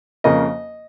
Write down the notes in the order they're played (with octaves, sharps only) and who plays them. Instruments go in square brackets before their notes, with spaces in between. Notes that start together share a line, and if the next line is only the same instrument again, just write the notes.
[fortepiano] F2 C#3 A#3 D#5